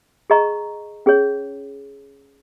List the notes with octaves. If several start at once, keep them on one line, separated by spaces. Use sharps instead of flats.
G#4 D#5 A#5 C#6
C#4 G#4 C#5